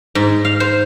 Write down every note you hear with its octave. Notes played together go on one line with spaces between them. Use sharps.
G#2
F5
C5